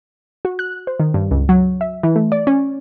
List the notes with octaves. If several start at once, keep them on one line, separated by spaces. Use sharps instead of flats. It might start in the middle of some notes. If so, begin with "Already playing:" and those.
F#4
F#6
C5
D#3
G2
C#2
F#3
E5
E3
A3
D5
C#4